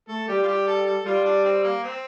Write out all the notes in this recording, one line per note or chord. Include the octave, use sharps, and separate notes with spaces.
A3 A4
G3 G4
F4
G4
A4
A4
G3 F4
D4
C4
A#3
C4